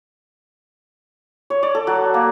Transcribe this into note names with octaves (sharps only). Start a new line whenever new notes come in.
C#5
D5
A4
F#3
A#3